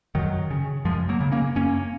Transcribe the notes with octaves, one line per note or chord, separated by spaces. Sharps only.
F#2 D#3 F#3
C#3
F#2 F3 G#3
F#3 A#3
C#3
A#3 C#4
F#2 A#3 C#4